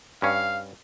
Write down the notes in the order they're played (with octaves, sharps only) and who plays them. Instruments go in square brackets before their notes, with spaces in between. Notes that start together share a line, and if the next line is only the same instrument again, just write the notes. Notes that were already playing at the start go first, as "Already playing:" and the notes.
[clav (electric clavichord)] G2 C#4 [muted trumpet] F5